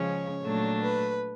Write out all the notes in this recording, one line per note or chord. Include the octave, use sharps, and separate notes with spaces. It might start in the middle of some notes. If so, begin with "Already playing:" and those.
Already playing: C#3 F3 G#3 C#4 C#5
A#2 F#3 A3 D4
B4